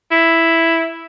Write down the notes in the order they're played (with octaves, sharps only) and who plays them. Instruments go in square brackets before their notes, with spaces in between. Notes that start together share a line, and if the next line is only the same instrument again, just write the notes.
[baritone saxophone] E4